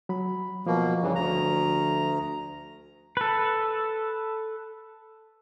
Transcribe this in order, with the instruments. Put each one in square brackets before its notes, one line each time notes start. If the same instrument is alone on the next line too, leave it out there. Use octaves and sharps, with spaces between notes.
[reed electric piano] F#3 B5
[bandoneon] B2 A#3 [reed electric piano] F3
[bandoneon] G2 C#3 E3
D2 A#5
[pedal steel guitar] A4 B4